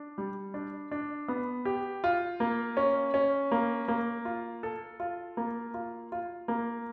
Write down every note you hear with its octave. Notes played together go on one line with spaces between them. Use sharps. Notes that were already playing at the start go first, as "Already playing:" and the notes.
Already playing: D4
G3
D4
D4
B3
G4
F4
A#3
C#4
C#4
A#3
A#3
F4
A4
F4
A#3
F4
F4
A#3